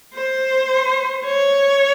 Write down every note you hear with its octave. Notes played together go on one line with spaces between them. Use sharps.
C5
C#5